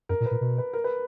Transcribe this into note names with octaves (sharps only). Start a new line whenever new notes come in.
F#2 A#4
A#2
B4
A#2
B2
B4
A#4
B4